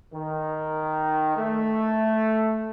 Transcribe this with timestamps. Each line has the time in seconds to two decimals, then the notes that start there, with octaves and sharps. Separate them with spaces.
0.13 D#3
1.37 A3